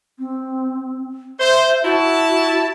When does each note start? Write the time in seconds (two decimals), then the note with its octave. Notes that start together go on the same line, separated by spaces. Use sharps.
0.19 C4
1.40 C5 E5
1.84 E4 F#4 A5